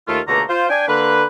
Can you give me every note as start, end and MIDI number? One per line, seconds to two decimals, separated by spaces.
0.08 0.20 39
0.08 0.20 57
0.08 0.20 65
0.28 0.43 37
0.28 0.43 47
0.28 0.43 50
0.28 0.43 57
0.28 0.43 58
0.28 0.43 82
0.49 0.66 65
0.49 0.66 72
0.70 0.88 62
0.70 0.88 79
0.70 0.88 80
0.88 1.25 50
0.88 1.25 58
0.88 1.25 71